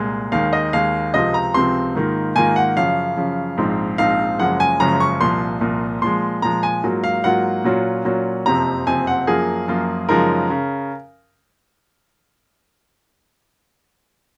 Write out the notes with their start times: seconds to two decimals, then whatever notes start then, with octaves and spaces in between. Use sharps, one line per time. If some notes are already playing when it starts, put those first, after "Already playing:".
Already playing: C2 A#2 G#3
0.32 D#2 D#3 G#3 F5
0.53 D#5
0.73 D#2 D#3 G#3 F5
1.14 C#2 C3 F3 C4 F4 D#5
1.34 A#5
1.54 C#2 C3 F3 C4 F4 C6
1.95 G#2 D#3 A#3 F4
2.36 G#2 D#3 A#3 F4 G#5
2.56 F#5
2.76 F#2 C#3 F3 F5
3.17 F#2 C#3 F3
3.57 A#1 G#2 F3 C4 D#4
3.98 A#1 G#2 F3 C4 D#4 F5
4.39 F#1 F#2 C#3 F3 G#3 F#5
4.60 G#5
4.80 F#1 F#2 C#3 F3 G#3 A#5
5.00 C#6
5.21 C2 A#2 F3 C6
5.61 C2 A#2 F3
6.02 A#2 F3 G#3 C6
6.42 A#2 F3 G#3 A#5
6.63 G#5
6.84 G#2 F#3 A#3 F4
7.04 F5
7.24 G#2 F#3 A#3 F4 F#5
7.64 A#2 F#3 C#4 F4
8.05 A#2 F#3 C#4 F4
8.46 F#1 F2 C3 F3 C4 A#5
8.87 F#1 F2 C3 F3 C4 G#5
9.07 F#5
9.27 F#2 F3 A#3 F4 G#4
9.68 F#2 F3 A#3 F4
10.09 F#2 C#3 F3 G#3 D#4 A#4
10.50 C#3